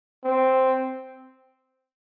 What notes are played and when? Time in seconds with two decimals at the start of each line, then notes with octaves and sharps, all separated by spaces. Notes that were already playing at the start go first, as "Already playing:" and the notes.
0.24 C4